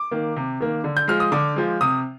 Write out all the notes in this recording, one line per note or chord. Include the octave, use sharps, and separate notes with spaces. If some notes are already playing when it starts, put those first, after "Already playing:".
Already playing: D6
D#3 A#3
C3
D#3 A#3
D3
G6
F3 G#3 F6
D#6
D3 D6
F3 G#3
C3 D#6